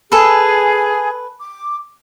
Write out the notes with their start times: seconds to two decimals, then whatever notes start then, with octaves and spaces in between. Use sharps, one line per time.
0.12 G#4 A4 B4 G#5
1.39 D6